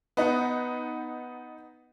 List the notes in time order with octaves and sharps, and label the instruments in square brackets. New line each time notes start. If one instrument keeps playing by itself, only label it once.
[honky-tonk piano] B3 D#4 F#5